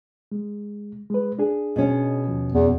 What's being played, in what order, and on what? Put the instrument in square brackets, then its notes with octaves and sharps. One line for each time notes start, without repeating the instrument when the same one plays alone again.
[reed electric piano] G#3
G#3 B4
D4 G#4
[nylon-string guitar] B2 C#4
[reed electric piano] D#2 F3
[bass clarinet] E2